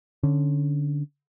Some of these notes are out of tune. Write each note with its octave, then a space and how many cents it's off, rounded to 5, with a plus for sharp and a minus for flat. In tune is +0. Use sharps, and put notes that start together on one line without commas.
D3 +0 C#4 +0